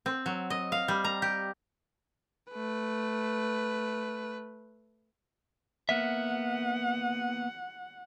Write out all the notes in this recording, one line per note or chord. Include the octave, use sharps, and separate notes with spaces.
C4
F#3
D#5
F5
G3
A#5
G4
A3 B4
A#3 B3 E5 F#5